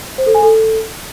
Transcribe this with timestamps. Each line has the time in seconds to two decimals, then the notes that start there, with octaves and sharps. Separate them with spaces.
0.18 C5
0.26 A4
0.35 G#5
0.43 A4